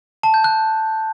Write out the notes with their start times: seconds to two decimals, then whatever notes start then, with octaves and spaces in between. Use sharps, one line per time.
0.23 A5
0.34 G6
0.44 F#6